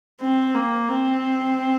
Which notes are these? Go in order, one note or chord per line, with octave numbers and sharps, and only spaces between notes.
C4
A#3
C4